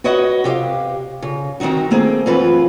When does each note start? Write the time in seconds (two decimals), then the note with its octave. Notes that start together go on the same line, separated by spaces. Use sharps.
0.04 F#4 B4 C#5 D#5 F#5
0.44 C3 G4 E5 F5
1.22 C#3
1.60 D#3 C4 D4 D#4 F#4
1.91 A3 A#3 C4 G#4
2.26 F#2 E3 C4 F4 B4